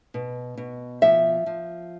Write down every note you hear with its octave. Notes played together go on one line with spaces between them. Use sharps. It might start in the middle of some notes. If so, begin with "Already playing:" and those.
B2
B2
F3 E5
F3